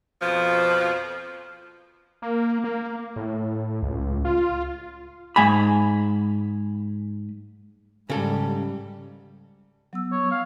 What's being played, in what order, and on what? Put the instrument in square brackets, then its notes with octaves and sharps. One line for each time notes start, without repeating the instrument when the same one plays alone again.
[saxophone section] F2 B2 F3
[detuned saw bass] A#3
A#3
A2
C#2
F4
[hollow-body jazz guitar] G#2 G#5 B5
[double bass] G#2 G3 [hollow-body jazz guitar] C#3 A4
[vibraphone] F#3 B3 E6
[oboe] C#5
F5